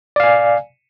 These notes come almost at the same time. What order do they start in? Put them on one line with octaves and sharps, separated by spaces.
D5 F5 G#5